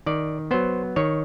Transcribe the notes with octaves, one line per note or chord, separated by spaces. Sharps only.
D#3 D5
F#3 B3 C5
D#3 C#5